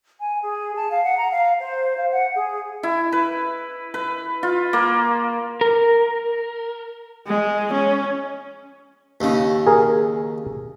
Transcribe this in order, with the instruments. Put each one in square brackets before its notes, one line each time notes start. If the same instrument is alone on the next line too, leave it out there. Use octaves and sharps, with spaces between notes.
[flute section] G#5
G#4
A5
F5
F#5
A#5
F5
C5
F5
F#5
G#4
[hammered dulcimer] E4
B4
B4
F4
A#3
[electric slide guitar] A#4
[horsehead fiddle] G#3
C#4
[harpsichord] D#2 C#3
[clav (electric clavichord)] G#4 A#4